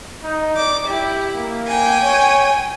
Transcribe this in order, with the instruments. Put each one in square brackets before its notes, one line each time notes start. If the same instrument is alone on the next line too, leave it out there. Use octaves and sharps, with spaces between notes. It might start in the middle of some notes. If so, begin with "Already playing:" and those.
[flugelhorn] D#4
[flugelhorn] D5 [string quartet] D6
[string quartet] E4 [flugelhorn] G4
[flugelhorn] A#3
[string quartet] G5 G#5
[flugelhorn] C#5